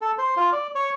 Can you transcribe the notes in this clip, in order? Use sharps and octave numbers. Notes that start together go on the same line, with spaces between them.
A4
C5
F4
D5
C#5